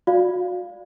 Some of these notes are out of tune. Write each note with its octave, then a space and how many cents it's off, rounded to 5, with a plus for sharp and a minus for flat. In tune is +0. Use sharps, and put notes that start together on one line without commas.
F#4 -35 D5 +0 F5 +0